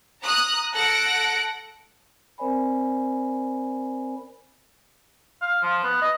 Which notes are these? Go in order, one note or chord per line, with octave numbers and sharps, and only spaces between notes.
A#5 D#6 F#6
A4 F#5 F#6 A#6 C#7 D7
C4 A#4 C5 D5 G#5 B5
F5
F3
B3
D#5